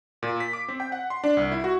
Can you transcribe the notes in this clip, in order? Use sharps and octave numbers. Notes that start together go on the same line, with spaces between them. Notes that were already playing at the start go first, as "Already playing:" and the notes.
A#2
B6
D6
C4
G5
F#5
C6
D4
C2
E4
F#4